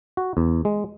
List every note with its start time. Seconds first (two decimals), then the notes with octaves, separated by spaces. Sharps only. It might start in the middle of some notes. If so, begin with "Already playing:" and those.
0.17 F#4
0.37 E2
0.65 G#3